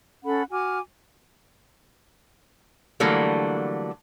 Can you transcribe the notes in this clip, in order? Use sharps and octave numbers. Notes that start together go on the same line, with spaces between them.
C#4 A4 F#5 B5
F#4 G#5 D6 F6
D3 E3 F#3 G3 A3 A#3